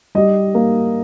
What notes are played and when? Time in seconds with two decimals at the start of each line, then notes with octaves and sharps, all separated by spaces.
0.15 G3 D#5
0.55 A#3